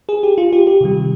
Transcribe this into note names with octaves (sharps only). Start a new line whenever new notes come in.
G#4
G4
F4
G4
G4
C3 D#3 G3